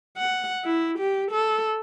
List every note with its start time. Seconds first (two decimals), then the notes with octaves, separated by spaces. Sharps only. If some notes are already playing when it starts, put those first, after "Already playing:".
0.17 F#5
0.64 E4
0.98 G4
1.31 A4